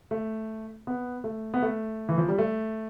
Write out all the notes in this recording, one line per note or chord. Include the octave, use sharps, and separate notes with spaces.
A3
B3
A3
B3
A3
E3
F3
G3
A3